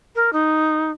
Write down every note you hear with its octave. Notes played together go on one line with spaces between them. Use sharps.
A#4
D#4